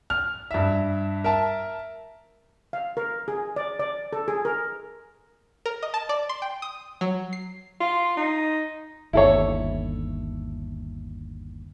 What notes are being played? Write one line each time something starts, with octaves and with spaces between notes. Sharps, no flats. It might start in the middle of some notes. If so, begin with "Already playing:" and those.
F6
G2 E5
A#4 E5 A5
F5
A#4
G#4
D5
D5
A4
G#4
A#4
A#4
D#5
A5
D5
C6
G5
D#6
F#3
C7
F4
D#4
G1 D#2 E4 A4 C#5